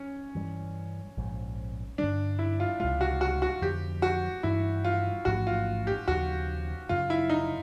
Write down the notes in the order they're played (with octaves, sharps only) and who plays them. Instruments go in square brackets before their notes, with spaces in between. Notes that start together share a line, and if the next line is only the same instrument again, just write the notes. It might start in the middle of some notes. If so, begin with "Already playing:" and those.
Already playing: [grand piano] C#4
[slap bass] G2 E3 G3
A#1 G#2 F3
[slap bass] G2 D3 G3 [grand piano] D4
[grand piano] E4
F4
[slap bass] C#2 C3 D#3 G#3 [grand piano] F4
[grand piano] F#4
F#4
F#4
[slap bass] F2 D3 F3 [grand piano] G4
[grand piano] F#4
[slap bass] G2 E3 G3 [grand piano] E4
[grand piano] F4
[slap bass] A1 G#2 F3 A3 [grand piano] F#4
[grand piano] F4
G4
[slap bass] D#2 C#3 F3 [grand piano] F#4
[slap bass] F#2 C#3 F#3 [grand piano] F4
[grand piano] E4
D#4